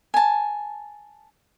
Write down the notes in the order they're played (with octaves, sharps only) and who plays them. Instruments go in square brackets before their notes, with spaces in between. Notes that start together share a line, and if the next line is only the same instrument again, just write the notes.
[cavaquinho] G#5 A5